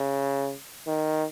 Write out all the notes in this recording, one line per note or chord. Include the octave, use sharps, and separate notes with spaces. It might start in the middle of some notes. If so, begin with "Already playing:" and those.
Already playing: C#3
D#3